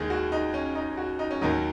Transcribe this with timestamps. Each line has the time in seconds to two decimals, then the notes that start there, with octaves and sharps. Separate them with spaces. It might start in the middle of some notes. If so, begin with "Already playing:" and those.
Already playing: D#2 D#3 G#3 G#4
0.10 F#4
0.32 D#4
0.54 C#4
0.75 D#4
0.97 F#4
1.19 D#4
1.31 C#4
1.41 D#2 D#3 F#3 D#4